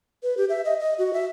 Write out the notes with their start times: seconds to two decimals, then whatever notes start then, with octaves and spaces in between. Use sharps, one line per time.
0.23 B4
0.37 G4
0.49 E5
0.65 D#5
0.80 D#5
0.99 F#4
1.13 E5